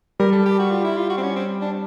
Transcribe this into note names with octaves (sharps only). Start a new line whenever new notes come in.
G3 A#4
A4
G4
F#4
F4
E4
F4
F#4
C4
C#4
C4
D4